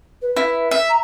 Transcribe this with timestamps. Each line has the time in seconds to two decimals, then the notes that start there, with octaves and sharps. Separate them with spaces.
0.21 B4
0.37 E4
0.71 E5
0.89 A#5